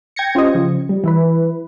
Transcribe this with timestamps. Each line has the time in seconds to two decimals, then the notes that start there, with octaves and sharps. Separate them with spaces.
0.16 G5 G#6 A#6 C#7
0.35 C#4 F4 G4 C5 D#5
0.54 C#3 F3
0.89 G3
1.04 E3 E4 B4